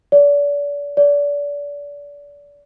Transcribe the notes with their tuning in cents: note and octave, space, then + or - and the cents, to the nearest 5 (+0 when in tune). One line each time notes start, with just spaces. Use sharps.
D5 -35
D5 -30